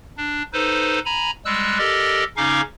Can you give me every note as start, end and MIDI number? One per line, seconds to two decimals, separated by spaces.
0.18 0.43 62
0.53 0.99 63
0.53 0.99 69
0.53 0.99 71
0.53 0.99 72
1.05 1.31 80
1.05 1.31 82
1.05 1.31 83
1.45 1.78 55
1.45 1.78 56
1.45 1.78 88
1.45 1.78 90
1.78 2.24 67
1.78 2.24 69
1.78 2.24 70
1.78 2.24 74
1.78 2.24 75
2.37 2.61 49
2.37 2.61 61
2.37 2.61 63
2.37 2.61 77
2.37 2.61 85
2.37 2.61 86